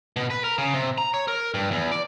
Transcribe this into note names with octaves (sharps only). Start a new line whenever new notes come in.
B2
B4
A#4
C#3
C3
A#5
C#5
A#4
G2
E2
D5